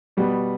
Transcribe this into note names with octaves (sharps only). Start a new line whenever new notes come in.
B2 G3 B3